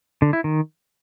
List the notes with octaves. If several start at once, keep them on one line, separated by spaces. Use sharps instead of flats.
D3
E4
D#3